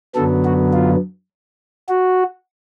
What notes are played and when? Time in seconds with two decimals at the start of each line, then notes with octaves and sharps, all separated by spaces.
0.15 F#2 D3 F#3 B3 A4
0.45 F#4
0.73 F4
1.89 F#4